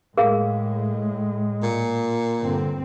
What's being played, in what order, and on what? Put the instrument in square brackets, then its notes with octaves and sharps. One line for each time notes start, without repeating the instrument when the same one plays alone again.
[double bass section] A2 [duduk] G#3 [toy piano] G#4 A#4 F5
[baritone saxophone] A#2
[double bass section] G2 C4 [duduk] D3